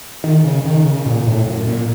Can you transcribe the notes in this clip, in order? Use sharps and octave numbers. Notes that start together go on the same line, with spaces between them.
D#3
C#3
D#3
C#3
A#2
A2
F#2
A#2